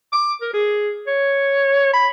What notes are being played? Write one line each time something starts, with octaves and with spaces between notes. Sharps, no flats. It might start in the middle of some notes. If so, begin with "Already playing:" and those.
D6
A#4
G#4
C#5
B5